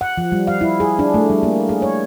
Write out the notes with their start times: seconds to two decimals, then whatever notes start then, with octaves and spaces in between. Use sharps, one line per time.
0.01 F#5
0.18 F3
0.32 G3
0.47 F5
0.61 E4
0.80 G#4
0.99 D4
1.14 A3
1.30 G3
1.43 A#3
1.69 G#4
1.82 C#5